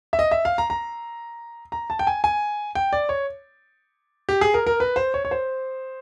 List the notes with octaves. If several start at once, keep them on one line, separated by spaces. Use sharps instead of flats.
E5
D#5
E5
F5
A#5
A#5
A#5
A5
G5
G#5
G#5
G5
D5
C#5
G4
G#4
A#4
A#4
B4
C5
C#5
C#5
C5